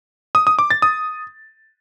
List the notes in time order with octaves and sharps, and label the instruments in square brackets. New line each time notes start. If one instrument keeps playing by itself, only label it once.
[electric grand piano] D#6
D#6
D6
A6
D#6